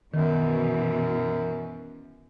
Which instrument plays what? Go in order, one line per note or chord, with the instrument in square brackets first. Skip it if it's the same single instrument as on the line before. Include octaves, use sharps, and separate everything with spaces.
[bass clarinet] F#2 [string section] B2 E3 [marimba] D#3